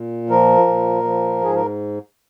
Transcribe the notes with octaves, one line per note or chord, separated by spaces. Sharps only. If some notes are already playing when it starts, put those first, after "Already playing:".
Already playing: A#2
F3 A#4
A#2
F3
G#2 G#4
A#4